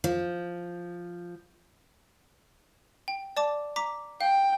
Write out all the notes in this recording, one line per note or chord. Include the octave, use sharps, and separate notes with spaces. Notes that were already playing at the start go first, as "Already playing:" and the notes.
F3
G5
D5 A5 D6
A#5 D6 B6
F5 G5